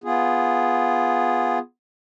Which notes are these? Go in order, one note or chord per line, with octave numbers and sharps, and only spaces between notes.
B3 F4 G#4